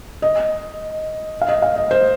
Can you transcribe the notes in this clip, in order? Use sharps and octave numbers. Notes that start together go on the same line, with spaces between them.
D#5
F5
D#5
F5
D#5
C5